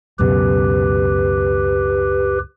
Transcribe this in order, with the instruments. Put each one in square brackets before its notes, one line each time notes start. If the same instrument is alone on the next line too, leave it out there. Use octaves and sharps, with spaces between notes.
[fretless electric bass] C#2 F#2 B2 [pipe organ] G4 B4